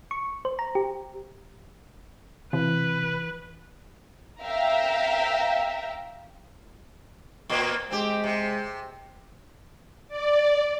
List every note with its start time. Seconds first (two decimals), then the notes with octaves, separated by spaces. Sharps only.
0.11 C#6
0.45 C5
0.59 A#5
0.75 G4
2.53 C3 E3 B4
4.42 E5 F5 G5 A#5
7.49 A#2 A#3 C4
7.91 G#3 C4 G4
8.24 C3
10.08 D5